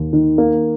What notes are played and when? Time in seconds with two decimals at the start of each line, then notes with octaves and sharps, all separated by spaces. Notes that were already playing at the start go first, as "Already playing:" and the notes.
Already playing: D#2
0.13 D#3
0.38 A#3